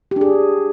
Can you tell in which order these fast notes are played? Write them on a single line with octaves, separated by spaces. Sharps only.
G4 D4 G#4